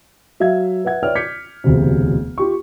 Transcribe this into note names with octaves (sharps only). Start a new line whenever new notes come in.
F#3 E5 F5 G#6
B4 E5 F#5 G#6
B4 C#5 D5 E5 G5 F6
D6 G6 G#6 B6 C#7
E1 D2 C3
F4 G4 C#6